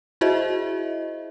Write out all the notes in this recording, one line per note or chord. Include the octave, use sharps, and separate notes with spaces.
E4 F#4 G#4 C5 D#5 E5